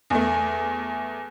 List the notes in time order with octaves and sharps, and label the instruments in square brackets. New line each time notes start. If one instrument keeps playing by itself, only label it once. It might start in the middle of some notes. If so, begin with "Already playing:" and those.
[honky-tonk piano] E2 A3